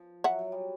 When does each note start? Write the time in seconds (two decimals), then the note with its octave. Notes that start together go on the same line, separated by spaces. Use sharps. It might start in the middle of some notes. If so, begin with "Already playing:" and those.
Already playing: F3
0.24 F#3 E5 F#5
0.39 F#3
0.52 G3